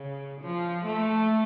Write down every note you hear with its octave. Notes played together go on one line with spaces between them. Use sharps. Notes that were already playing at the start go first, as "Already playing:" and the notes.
Already playing: C#3
F3
A3